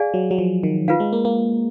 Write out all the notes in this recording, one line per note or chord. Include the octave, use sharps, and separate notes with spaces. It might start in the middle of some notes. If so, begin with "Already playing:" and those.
Already playing: G#4 D5 F5 G#5
F#3
F#3
F3
D#3
D#3 F4 B4 F5
G#3
A#3
A#3